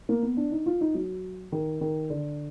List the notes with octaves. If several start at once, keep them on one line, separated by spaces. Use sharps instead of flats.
A#3
B3
D4
D#4
F4
D#4
F#3
D#3
D#3
D3